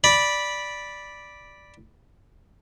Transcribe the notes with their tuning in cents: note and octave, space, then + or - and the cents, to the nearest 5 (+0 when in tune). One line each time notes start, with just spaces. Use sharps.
D5 +0 B5 -10